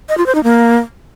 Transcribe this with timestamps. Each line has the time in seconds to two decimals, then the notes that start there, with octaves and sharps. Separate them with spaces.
0.09 D#5
0.18 F4
0.26 C5
0.35 D#4
0.44 A#3